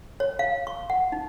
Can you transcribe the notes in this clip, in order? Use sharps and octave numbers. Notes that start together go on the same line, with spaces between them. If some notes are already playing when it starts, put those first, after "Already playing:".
C#5
F5
C#6
F#5
D#4